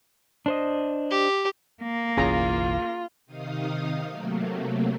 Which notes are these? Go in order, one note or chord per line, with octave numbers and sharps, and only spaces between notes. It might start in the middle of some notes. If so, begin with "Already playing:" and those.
D4 C5 D#5
G4
A#3
F#1 B1 E3 C#4 F4 G#4 A#5
C3 D#3 D#4 F5 D#6
C3 F#3 A3 A#3